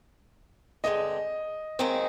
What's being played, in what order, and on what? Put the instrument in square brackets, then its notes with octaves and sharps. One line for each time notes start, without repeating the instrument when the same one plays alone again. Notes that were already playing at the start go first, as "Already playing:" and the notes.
[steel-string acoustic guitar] G2 D3 G#3 C4 [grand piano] D#5
[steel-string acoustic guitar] D#2 D#3 G#3 C4 D#4